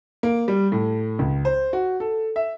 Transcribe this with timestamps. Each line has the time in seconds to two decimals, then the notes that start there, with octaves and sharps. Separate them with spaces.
0.23 A#3
0.48 G3
0.72 A2
1.19 C#2
1.45 C5
1.73 F#4
2.00 A4
2.36 E5